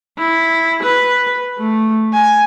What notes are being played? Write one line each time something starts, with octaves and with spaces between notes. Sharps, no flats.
E4
B4
A3
G#5